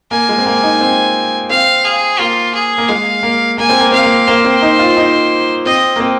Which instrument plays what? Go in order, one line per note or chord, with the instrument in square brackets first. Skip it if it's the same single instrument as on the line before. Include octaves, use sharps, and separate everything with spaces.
[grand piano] A#3 [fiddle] G#5
[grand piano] G#3
C4
A#3
D#4
C4
[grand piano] C4 [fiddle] F5
[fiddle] G#4
[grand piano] A#3 [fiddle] F4
[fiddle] G#4
[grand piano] A#3
[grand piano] G#3 [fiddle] F5
[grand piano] A#3
[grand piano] A#3 [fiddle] G#5
[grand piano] C4
A#3
[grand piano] C4 [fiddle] F5
[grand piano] A#3
[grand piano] A#3 [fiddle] C5
[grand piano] C4
D#4
F4
D#4
[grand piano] C4 [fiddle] D#5
[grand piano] A#3
C4